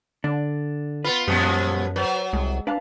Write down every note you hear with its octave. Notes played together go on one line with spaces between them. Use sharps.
D3 D4
B3 F4 B4
F#2 A#2 F3 G3 B3 C#4
F#3 B4 C5
C2 G#3
D4 B4 F5 A5